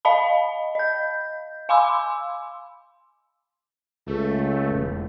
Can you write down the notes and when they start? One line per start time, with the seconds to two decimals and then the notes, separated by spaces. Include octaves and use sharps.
0.05 D#5 F5 A5 B5
0.75 D#5 G6
1.69 F5 G#5 B5 C6 D6 E6
4.08 C#2 A3
4.71 E1